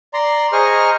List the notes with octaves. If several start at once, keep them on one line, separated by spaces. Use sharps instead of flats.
D5 A#5 C6
G#4 C5 D#5 A#5 C#6 F6